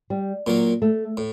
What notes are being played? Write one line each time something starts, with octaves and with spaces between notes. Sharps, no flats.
G3
A#2 F#3 A#3
A3
A2